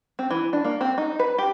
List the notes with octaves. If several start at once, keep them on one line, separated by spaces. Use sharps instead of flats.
C4
E3
D4
A#3
C4
D#4
B4
G4